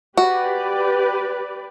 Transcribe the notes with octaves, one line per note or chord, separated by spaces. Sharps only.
F#4 G4 B4 D5